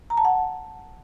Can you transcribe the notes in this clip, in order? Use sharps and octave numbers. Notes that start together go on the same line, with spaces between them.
A#5
A5
F#5